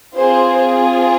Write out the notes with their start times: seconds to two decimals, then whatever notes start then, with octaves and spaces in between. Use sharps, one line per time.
0.15 C4 F4 G#4 C5